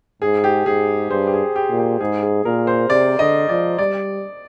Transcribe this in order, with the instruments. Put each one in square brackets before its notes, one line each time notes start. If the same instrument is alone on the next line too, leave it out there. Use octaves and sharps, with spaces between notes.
[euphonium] G#2 [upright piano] G#4
[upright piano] G4
[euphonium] G#2 [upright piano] G#4
[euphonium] G2 [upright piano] C5
[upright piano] G4
G#4
G4
[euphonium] A#2
[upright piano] G4
[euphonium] G#2 [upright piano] G#4
[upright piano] G#4
[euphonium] A#2 [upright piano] A#4
[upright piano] C5
[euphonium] C3 [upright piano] D5
[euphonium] D3 [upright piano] D#5
[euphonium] F3 [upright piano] D5
[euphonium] G3 [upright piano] D5